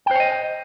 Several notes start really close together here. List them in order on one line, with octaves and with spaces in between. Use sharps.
G5 C5 C#5 D#5